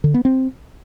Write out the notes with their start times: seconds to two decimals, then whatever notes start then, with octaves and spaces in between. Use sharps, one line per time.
0.04 D3
0.14 B3
0.25 C4